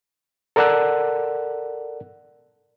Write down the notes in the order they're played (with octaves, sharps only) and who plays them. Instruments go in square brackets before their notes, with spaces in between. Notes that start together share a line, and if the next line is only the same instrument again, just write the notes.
[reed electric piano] A4 A#4 D5 F#5 E6 F#6